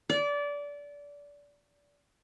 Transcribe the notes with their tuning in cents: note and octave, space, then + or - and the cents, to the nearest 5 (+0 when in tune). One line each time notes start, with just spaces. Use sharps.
D5 -25